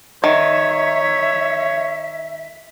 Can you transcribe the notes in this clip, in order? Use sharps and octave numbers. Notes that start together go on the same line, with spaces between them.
D#3 C#5 E5